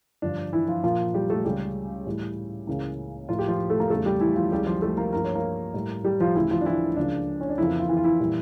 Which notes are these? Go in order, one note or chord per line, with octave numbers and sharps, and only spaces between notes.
G2 D3 F3 D4
E3 E4
F3 F4
A#2 F3 A#3 F4
G3 G4
A3 A4
C#2 C#3 G3 G4
A2 E3 G3
C#2 C#3 E3 A#3
A2 F3 A#3 F4
G4
F3 F4
A3 A4
A#3 A#4
E2 C#3 G3 A3 A#3 A4
G3 G4
E3 E4
F3 F4
C#2 C#3 E3 G3 G4
F3 F4
A3 A4
A#3 A#4
G2 F3 A#3 A#4
C#5
A#3 A#4
A2 G3 A#3
G3 G4
F3 F4
D2 C#3 E3 G3 E4
F3 F4
D4
E3 E4
C#2 C#3 F3 A#3 D4
C#4
D4
F2 C#3 E3 F3 A#3 E4
F4
E3 E4
F4
E3 E4
A#2 G3 A#3